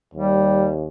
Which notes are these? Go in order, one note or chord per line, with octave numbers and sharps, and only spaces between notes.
D#2 G3